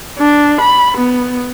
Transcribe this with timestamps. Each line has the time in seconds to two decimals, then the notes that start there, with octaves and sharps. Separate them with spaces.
0.19 D4
0.61 B5
0.97 B3